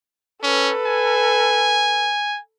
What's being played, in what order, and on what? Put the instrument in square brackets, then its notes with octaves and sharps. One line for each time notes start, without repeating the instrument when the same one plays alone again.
[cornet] C#4 [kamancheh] A4 B4
[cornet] G#5